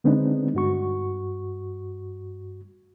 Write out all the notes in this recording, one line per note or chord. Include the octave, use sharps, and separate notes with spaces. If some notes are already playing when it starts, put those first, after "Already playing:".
D3 G#3 B3 C4 D4 D#4
G2 F#4 C#6